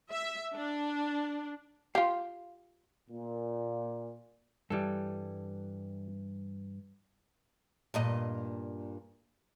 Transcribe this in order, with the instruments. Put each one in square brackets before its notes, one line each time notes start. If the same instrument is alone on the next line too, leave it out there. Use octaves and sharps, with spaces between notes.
[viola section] E5
D4
[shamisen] F4 G4 [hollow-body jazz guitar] F5
[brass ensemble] A#2
[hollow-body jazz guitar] G2 E3 [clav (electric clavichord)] G3 A4
[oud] G2 A#2 D#5